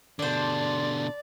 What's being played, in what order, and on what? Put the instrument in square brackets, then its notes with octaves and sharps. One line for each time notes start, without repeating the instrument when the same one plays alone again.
[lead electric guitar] B2 D3 [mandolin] D4 C5 [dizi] D5